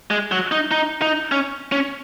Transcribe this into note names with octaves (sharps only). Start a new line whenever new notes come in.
G#3
F#3
D#4
D#4
D#4
C#4
C#4